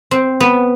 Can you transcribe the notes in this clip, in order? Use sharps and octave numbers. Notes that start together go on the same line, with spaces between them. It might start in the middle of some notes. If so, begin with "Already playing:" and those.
C4
B3